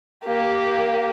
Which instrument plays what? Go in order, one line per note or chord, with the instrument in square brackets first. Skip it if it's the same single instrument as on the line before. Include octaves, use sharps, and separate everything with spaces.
[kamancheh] A#3 G4